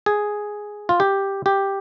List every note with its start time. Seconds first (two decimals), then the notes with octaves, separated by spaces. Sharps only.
0.06 G#4
0.89 F4
1.00 G4
1.46 G4